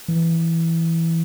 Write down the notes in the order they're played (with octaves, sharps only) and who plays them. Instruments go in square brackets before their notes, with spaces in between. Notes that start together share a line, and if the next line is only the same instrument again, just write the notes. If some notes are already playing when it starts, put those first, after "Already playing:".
[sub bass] E3